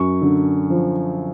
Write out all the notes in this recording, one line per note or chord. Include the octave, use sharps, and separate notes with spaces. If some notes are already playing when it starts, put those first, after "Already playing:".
Already playing: F#2 C#6
D3
F3